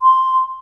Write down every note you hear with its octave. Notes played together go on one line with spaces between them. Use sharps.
C6